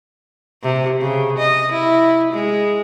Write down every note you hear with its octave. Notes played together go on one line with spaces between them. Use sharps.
C3
C#3
D#5
E4
G#3